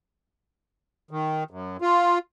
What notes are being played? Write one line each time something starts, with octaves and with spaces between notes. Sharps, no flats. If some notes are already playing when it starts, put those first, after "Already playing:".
D#3
F#2
F4